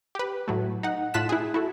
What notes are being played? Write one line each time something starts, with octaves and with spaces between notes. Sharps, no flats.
G4 B4
A2 F#3 A3
D#4 F#5
A2 F4 A5 F#6 B6 E7
E4 G#4
E4 F#4 A4